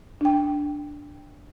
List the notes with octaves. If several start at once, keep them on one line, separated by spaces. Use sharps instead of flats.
D4 G5